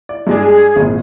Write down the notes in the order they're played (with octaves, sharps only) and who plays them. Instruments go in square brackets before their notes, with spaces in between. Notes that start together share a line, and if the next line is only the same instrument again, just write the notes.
[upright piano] D5
[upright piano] G2 G#3 D4 [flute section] G#4
[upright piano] G#1 A#2